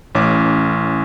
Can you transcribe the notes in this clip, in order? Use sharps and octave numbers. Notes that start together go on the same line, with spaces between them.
A1 C#4 D6